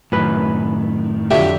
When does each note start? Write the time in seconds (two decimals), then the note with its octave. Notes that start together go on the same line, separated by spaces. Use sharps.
0.12 F#2 A2 D#3 B4
1.31 F2 D3 F#3 G4 E5